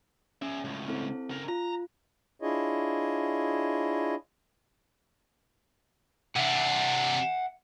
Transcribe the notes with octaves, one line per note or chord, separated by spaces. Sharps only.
C#4 G#4 E5
C#2 A2
C4 E4 A4
C#3 A#4
F4 A#5
D4 E4 F4 G#4 C#5 D#5
C3 D4 E5 F#5